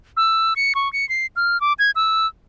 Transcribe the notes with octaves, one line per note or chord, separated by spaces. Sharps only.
E6
C#7
C#6
C#7
C7
F6
D6
G#6
E6